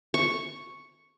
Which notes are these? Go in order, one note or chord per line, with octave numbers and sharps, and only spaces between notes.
C#6